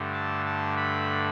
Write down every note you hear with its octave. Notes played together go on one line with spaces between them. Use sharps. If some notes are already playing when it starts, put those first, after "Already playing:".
Already playing: G2 D3 A3
A5
A5
B5